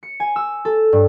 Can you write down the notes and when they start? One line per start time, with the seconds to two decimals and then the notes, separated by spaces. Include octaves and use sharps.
0.03 C#7
0.20 G#5
0.36 E6
0.65 A4
0.93 G2